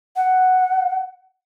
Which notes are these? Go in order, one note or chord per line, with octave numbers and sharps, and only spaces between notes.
F#5